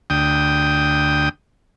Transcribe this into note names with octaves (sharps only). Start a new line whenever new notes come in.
D2 G5 D#6